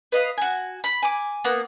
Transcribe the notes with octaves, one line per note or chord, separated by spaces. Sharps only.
B4 D#5 F5
F#4 G#5
B5
G#5 D6
A#3 B3 F#5 F#6